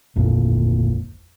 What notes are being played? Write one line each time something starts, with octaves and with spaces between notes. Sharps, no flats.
D1 G#1 F2 A#2